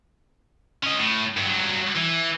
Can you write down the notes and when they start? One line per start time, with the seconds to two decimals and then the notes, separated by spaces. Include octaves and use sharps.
0.84 C#4 D#5
0.98 A2
1.37 G2 F#3
1.96 E3